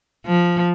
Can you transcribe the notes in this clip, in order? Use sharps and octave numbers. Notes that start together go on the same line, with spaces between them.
F3